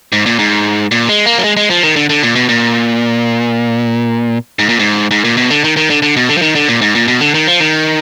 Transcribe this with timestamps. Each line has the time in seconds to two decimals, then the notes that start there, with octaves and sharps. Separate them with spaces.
0.12 G#2
0.26 A#2
0.39 G#2
0.91 A#2
1.09 G#3
1.26 A#3
1.38 F#3
1.44 G#3
1.57 G#3
1.70 F3
1.83 D#3
1.96 D3
2.10 D3
2.23 A#2
2.36 B2
2.49 A#2
4.59 G#2
4.69 A#2
4.79 G#2
5.11 G#2
5.25 A#2
5.37 B2
5.51 D3
5.64 D#3
5.77 D#3
5.90 D3
6.02 D3
6.17 B2
6.29 D3
6.37 F3
6.42 D#3
6.55 D3
6.69 A#2
6.82 G#2
6.95 A#2
7.08 B2
7.21 D3
7.34 D#3
7.48 F3
7.60 D#3